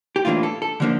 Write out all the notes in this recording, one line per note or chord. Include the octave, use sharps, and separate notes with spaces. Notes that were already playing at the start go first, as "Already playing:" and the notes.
G4
A2 E3 A#3 D4 F4
A4
A4
D3 F3 A#3 D4